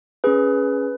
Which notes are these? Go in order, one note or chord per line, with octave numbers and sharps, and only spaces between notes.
C#4 G#4 B4